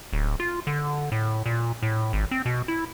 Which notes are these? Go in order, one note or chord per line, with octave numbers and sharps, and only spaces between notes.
D1
F4
D3
A2
A#2
A2
G#1
C4
B2
E4